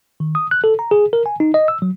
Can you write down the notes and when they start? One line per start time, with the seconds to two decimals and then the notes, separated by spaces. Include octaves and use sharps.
0.20 D#3
0.35 D#6
0.51 F#6
0.64 A4
0.79 A#5
0.91 G#4
1.13 A#4
1.26 G#5
1.40 D#4
1.54 D#5
1.68 E6
1.82 F#3